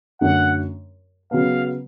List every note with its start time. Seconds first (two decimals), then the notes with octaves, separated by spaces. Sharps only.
0.21 F#2 D3 F#3 A3 F#5
1.31 C#3 F#3 B3 F5